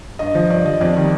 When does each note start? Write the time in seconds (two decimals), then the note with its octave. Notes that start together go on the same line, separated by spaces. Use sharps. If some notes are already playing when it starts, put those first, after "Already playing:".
0.19 G2 D#5
0.35 F3
0.50 G2 D5
0.65 F3 D#5
0.81 F2 D5
0.96 D#3 G3